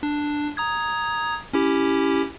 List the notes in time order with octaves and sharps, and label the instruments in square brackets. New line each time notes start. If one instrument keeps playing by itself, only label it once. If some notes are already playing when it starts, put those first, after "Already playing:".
[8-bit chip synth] D4
A#5 D#6 G#6
C#4 E4 G4